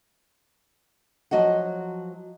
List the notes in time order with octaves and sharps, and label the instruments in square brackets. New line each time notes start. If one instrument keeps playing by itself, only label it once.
[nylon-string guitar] F3 F#3 F#4 D#5 F#5